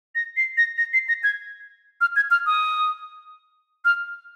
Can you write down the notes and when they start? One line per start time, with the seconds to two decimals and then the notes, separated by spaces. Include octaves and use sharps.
0.15 A#6
0.37 C7
0.57 A#6
0.78 A#6
0.93 C7
1.08 A#6
1.24 G#6
2.01 F6
2.16 G#6
2.31 F6
2.46 D#6
3.85 F6